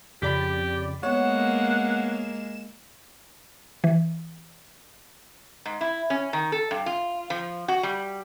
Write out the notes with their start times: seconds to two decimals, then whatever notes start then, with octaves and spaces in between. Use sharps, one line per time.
0.22 F2 C#3 G4 D5 B5 B6
1.03 G#3 A#3 B3 C#5 F#5 E7
3.84 E3
5.65 G#2
5.81 E4
6.10 C#4
6.33 D#3
6.52 A4
6.71 G2
6.86 F4
7.30 F3
7.68 F#4
7.83 G3